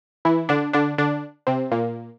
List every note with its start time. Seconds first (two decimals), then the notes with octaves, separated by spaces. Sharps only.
0.25 E3 E4
0.49 D3 D4
0.73 D3 D4
0.98 D3 D4
1.47 C3 C4
1.71 A#2 A#3